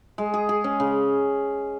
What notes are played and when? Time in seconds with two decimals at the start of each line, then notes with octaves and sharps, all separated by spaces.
0.18 G#3
0.34 G#4
0.49 G#4
0.64 C#4
0.80 C#3